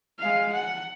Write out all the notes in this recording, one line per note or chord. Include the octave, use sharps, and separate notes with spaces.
G#3 F5
F#5